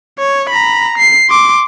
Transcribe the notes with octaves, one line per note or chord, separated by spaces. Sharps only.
C#5
A#5 B5
C7
C6 D6